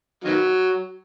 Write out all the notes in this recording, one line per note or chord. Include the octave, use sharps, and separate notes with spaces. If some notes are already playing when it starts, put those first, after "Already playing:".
D#3 F#3